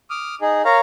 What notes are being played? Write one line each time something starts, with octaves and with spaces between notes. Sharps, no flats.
D6 D#6 F6
D#4 G#4
A#4 C#5 F5 A#5